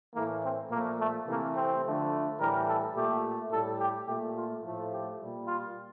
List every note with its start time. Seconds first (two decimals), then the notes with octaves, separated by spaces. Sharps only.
0.14 A2 E3 A3 A#3
0.42 C4
0.70 A#2 F3 A3 A#3
0.98 A3
1.26 C3 E3 A3 A#3
1.55 C4
1.83 D3 F3 A3
2.39 A2 E3 G3 A#4
2.67 A4
2.95 A#2 A3 G4
3.50 A2 G3 A4
3.78 G4
4.07 A#2 A3 G4
4.35 F4
4.63 A2 F3 A3
4.91 G4
5.19 A#2 G3
5.47 F4